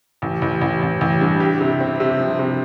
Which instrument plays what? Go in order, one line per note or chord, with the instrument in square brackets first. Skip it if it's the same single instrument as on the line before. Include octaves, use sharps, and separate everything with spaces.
[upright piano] A1
A1
A1
A1
A1
G2
G4
C3
C4
C3
F3
C3